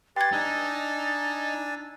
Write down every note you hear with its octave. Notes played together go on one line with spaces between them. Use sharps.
G4 B4 G5 C6 G#6 A6
D4 D#4 G#5 E6